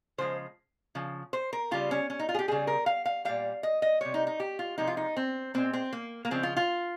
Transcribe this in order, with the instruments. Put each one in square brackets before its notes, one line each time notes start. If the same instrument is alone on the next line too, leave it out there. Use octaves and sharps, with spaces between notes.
[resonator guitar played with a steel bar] C#3 F3 G#3 C5
C#3 F3
C5
A#4
C#3 G3 F4
C#4
C#4
D#4
F4
G#4
G4
C#3 G3 G#4
A#4
F5
F5
A#2 G3 F5
D#5
D#5
C3 G3 C#5
D#4
D#4
G4
F4
C3 F3 G#3 D#4
F4
D#4
C4
A#2 G#3 C4
C4
A#3
A#3
C#3 F3 G#3 C4
F4
F4